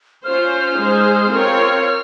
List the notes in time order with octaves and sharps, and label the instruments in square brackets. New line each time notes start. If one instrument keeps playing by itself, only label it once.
[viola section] C#4 F4 C5 [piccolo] F6
[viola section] G#3 D#4 G#4 C5
C4 F4 A#4 C#5
[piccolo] F6